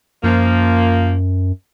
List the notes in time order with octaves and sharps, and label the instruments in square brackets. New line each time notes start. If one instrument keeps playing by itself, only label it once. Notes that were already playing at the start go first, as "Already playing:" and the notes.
[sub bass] F#2 [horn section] F3 A#3